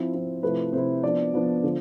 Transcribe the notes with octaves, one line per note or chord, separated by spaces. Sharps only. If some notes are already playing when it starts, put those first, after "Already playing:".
Already playing: F3 C4 E4
F3 C4 E4
C3 F3 A3 E4 B4
C3 F3 A3 E4 C5
F3 B3 D4 D5
F3 B3 D4
D3 F3